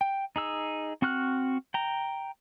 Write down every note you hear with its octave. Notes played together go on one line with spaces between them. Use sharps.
G5
D#4 G#4 E6
C4 F#4 C#6 F6 F#6
G5 A#5